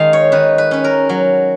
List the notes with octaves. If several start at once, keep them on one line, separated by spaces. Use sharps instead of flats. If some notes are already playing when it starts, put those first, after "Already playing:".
Already playing: D#3 G#3 F5
C#5
D#3 B4
B4
C#4 B4
A#4
F#3